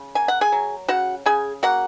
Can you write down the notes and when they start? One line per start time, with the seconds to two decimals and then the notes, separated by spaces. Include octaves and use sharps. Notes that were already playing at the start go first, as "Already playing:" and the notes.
Already playing: C#3
0.15 A#3 G#5
0.28 F#5
0.41 G#4 G#5
0.52 F#3
0.88 C#3 F#4 F#5
1.26 C#3 G#4 G#5
1.63 A#3 F#4 F#5